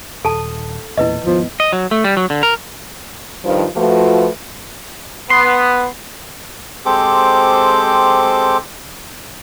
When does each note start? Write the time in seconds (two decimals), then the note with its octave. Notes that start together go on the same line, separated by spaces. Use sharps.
0.25 D#1 A4 A5
0.98 E1 E2 A#2 E4 B4 D#5
1.24 D#2 G#2 F3 B3
1.60 D#5
1.73 F#3
1.91 A3
2.04 G3
2.17 F#3
2.30 D3
2.43 A#4
3.45 G2 D#3 F3
3.76 F3 A3 F4 F#4 B4
5.30 B3 C6
6.86 G#3 C4 G4 A4 C5 D6